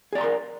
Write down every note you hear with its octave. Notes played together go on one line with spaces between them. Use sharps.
G#4 A#4 D5 A#5 C6